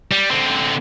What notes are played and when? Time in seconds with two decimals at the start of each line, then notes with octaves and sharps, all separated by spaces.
0.11 G3
0.31 D3 C4